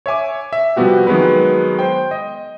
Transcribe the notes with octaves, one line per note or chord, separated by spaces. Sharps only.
C#5 E5 G#5 D6
E5
C3 F3 G3 B3 F#4 G4
D#3 F#3 G#3 B3 B4
C5 G5
D#5